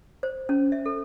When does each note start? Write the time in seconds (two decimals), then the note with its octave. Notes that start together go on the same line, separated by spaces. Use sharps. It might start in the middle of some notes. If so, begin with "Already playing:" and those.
0.23 C5
0.49 C#4
0.72 E5
0.86 A4